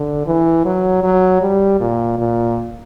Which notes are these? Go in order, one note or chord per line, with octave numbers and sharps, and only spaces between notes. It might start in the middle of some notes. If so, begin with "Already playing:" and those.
Already playing: D3
E3
F#3
F#3
G3
A#2
A#2